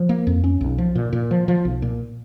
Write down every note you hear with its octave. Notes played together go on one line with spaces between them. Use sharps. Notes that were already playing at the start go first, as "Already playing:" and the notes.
Already playing: F3
A#3
F2
C#4
B1
F3
A#2
A#2
F3
F3
B1
A#2